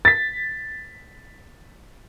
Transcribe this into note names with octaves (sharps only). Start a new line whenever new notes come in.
A6 B6